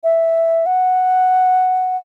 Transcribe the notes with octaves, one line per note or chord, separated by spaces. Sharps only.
E5
F#5